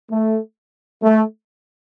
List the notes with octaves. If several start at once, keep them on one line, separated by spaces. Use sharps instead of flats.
A3
A3